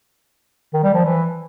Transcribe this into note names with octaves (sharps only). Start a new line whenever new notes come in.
D#3
G3
F3
E3